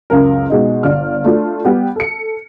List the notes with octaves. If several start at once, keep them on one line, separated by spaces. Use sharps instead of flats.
C#2 F#2 A#4
B2 G#3 D#4
G1 D5 F6
A3 D4 F4
G3 B3 G4
A4 C#7